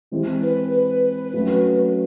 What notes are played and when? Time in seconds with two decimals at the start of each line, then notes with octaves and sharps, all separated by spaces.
0.11 E3 G#3 C4 E4 G4
0.43 B4
0.72 B4
1.34 F#3 A3 C#4 F#4